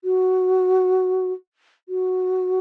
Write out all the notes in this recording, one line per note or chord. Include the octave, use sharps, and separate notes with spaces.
F#4
F#4